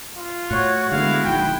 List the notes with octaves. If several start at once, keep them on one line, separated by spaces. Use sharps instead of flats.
F4
A2 F#4 C#5
D3 G#3 A3 B3 E4 F5
D1 A#1 D#3 G5